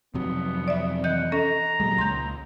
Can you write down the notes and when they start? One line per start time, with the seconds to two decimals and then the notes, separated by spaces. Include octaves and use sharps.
0.14 F2 C3 F#3 B3
0.68 D5 E5
1.04 E3 D#5 F#5 G6
1.32 C#4 A4 D#5 A#5
1.80 A#2 F#3 G#3
1.98 C#2 C6 G6